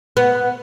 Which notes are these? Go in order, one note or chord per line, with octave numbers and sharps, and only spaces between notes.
B3